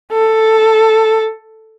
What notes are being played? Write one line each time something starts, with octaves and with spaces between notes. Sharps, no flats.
A4